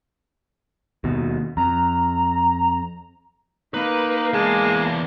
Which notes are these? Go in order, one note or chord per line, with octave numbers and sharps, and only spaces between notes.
D#2 B2
F2 A#5
A#3 D#4 B4
E2 G#3 A5